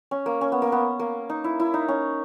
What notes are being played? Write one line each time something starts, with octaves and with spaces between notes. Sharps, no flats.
C#4
A#3
C#4
B3
A#3
B3
A#3
D#4
E4
E4
D#4
C#4